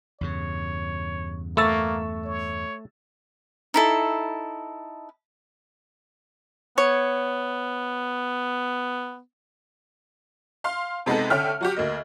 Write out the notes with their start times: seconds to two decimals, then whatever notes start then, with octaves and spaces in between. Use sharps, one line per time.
0.21 E2 G2 C#3 C#5
1.57 A3 A#3 C#6 E6 A6
2.25 C#5
3.74 D#4 E4 A4
6.78 B3 C#5
10.64 F5 C6
11.06 C3 G#3 B3 D#4 A4
11.30 D3 C#4 E5 G5 F6
11.61 F#3 F#4 G4
11.76 D2 A#3 D#5